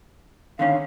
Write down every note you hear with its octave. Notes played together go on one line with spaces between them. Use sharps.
D3 D#3 C#4 F5